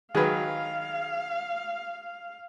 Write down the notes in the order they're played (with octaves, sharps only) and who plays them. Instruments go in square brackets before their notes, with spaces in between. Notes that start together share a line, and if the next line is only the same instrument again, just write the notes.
[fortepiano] D#3 F#3 G#3 [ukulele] G#4 B4 [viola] F5